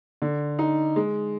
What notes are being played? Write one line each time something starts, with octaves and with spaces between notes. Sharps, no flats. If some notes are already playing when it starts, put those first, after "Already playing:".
D3
D#4
G#3